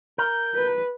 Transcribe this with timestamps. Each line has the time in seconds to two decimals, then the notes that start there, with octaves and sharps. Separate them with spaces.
0.18 A#4 G6
0.55 B4